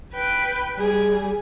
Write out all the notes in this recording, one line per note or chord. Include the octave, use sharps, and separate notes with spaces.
B4 G5
G3 G#4